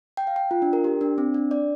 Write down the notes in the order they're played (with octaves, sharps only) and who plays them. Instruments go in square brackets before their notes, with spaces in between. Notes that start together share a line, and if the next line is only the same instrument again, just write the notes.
[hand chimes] G5
F5
G5
F4
D4
A#4
G4
D4
C4
D4
D5